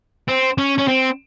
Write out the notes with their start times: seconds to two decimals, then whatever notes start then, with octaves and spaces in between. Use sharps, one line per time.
0.29 C4
0.58 C#4
0.78 C#4
0.87 C4